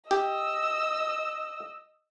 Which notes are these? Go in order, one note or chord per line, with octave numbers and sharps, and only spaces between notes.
G4 D#5 E6